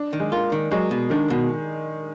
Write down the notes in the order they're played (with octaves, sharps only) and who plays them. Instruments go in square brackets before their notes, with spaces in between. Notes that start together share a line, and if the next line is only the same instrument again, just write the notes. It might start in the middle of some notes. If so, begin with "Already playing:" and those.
Already playing: [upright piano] D4
[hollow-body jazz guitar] D#3
[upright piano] G#3
[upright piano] A#3 [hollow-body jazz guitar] F4
[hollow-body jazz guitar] D#3
[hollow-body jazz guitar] F#3 [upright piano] G#3
[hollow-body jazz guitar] B2
[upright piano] D#3 [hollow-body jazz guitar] D4
[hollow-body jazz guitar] B2